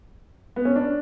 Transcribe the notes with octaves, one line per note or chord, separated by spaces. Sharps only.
B3
C#4
D4